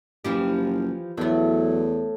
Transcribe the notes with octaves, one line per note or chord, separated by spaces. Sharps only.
F#1 E3 F3 G4
E2 A2 F#3 B3